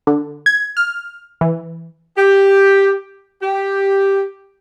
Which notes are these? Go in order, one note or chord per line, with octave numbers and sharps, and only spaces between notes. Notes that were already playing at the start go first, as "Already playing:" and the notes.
D3
G#6
F6
E3
G4
G4